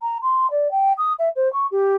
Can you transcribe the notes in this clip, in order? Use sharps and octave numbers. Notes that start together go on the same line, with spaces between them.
A#5
C6
D5
G5
D#6
E5
C5
C#6
G4